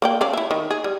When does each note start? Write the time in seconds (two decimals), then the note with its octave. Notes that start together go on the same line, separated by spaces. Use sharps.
0.02 A#3 D5 G5
0.21 C#4 D5 F5
0.33 E4 E5
0.51 D#3
0.71 G#4
0.84 G3